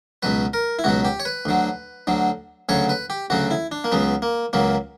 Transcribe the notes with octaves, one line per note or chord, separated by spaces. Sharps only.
C#2 B2 F#3 B4
A#4
E4
C#2 B2 F#3 F#4
G4
C#5
B4
D2 D3 F#3
D2 D3 F#3
D2 C#3 F#3 C#5
B4
G4
D2 C#3 F#3 F#4
E4
D4
A#3
C#2 C#3 F#3 B3
A#3
C#2 C#3 F#3 A#3